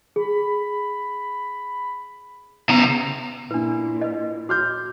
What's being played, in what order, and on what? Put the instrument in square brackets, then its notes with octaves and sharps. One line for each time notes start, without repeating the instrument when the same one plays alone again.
[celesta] G#4 [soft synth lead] B5
[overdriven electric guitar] C#3 A#5 [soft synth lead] B3
[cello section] A#2 [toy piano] D4 B4 [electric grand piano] E4
[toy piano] B4 D#5
[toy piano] F#4 [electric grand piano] D6 F6 G6